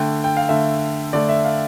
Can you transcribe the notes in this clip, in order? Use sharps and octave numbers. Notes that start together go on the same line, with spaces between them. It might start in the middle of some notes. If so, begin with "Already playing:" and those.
Already playing: D3 A3 G5
G5
F5
D3 A3 E5
D3 A3 D5
E5
F5